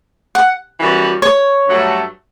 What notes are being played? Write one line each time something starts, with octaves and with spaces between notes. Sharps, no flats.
F#5
F#2 E3 G3 B3 F#4
C#5
G2 F#3 A3